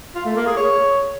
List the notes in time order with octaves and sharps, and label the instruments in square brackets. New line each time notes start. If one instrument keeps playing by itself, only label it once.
[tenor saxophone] F4
A3
A#3
G#4
C#5